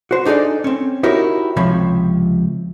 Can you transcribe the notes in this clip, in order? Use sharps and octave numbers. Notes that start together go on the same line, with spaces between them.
F#4 C5
D4 D#4 G#4 A4 D5
C4 C#4
D#4 E4 F#4 G4 A#4 C#5
C#2 C3 F3 C#5 B5